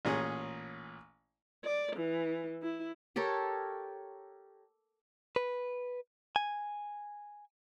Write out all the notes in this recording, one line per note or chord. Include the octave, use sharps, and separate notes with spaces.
A1 A#2 C#4 G#4 D#6
D5
E3
E4
G4 A4 A#4 C#5
B4
G#5